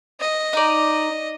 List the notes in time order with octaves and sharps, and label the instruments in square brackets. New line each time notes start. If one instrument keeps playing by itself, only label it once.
[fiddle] D#5
[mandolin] D#4 D5